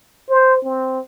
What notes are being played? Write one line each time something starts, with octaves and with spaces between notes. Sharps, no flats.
C5
C4